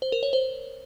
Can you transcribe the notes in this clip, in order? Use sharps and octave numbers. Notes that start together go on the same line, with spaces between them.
C5
A#4
C#5
C5